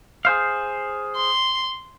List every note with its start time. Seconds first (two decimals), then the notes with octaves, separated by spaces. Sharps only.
0.25 G#4 C5 F5
1.16 C6